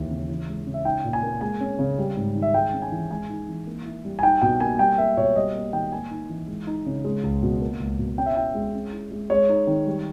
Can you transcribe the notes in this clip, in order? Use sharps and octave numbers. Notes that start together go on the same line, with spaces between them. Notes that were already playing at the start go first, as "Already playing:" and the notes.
Already playing: D#2 E3
C#3
E3
G#3
C#3
E5
D#4 G5
A#2
G#5
A#3
G#3 G#5
C#4
C#3
G3
G#2
D#3
E5
G#3 G5
C#4
G#5
E3
G#3 G#5
D#4
E3
A#3
E4
G3
G#5
D#4 G5
B2 G5
A#3 G#5
G3 G5
A#3 E5
B2 C#5
G3 D#5
A#3
D#3 G5
A#3 G#5
D#4
E3
G#3
D#4
C#3
G#3
C#2
B2
A#3
C#2
B2
C#4 G5
E5
E4 G5
G#3
C#4
E4
G#3
G#3 C#5
D#4
D#3
G3